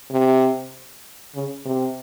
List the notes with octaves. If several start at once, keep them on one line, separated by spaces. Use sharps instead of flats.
C3
C#3
C3